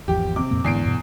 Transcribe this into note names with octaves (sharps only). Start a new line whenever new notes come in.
G#1 E2 F3 G4
C3 D6
F2 A#2 A#3
E2 G#2 D3 C7 D7
G2 B2